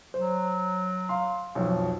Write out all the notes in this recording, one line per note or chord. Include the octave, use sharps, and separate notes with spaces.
F#3 C5
F5 C6
B1 F2